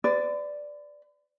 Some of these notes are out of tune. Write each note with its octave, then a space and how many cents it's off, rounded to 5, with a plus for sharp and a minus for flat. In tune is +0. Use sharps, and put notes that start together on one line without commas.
B4 +45 D5 +0